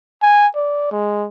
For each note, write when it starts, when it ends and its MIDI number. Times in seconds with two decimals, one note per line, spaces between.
0.22 0.47 80
0.55 0.88 74
0.92 1.27 56